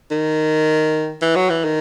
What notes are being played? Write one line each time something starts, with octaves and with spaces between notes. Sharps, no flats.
D#3
E3
F#3
E3
D#3